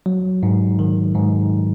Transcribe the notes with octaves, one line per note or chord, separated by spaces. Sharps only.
F#3
G#2
D#3
G#2